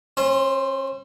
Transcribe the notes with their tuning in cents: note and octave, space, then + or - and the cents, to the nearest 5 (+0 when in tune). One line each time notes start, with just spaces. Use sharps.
C#4 -40 C5 +0